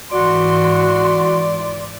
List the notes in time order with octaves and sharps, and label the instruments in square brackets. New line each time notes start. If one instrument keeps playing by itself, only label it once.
[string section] G#2 E3 [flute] F#4 [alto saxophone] D5 [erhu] C6